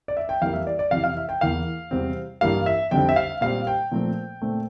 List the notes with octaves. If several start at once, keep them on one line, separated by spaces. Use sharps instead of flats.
D5
E5
G5
F2 E3 G3 A#3 F5
E5
D5
D5
F2 C3 E3 F5
F5
E5
G5
E2 E3 A#3 F5
E2 C3 G3 C4
G2 E3 G3 A#3 F5
E5
F2 D3 G3 C4 G5
E5
F5
A#2 G3 C4 F5
G5
A#2 F3 A3 C4
A#2 A3 C4